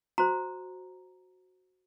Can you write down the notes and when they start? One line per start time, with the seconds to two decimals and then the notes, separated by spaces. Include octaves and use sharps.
0.18 F#4 C5 A#5